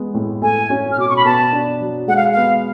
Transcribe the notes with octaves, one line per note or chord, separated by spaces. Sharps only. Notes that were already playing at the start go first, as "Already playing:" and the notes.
Already playing: G#3 B3
A2
A3 G#5
C#4
F6
B2 D6
C#6
B5
B3 A5
D4
F#3
G#3 F#5
F5
B3 F5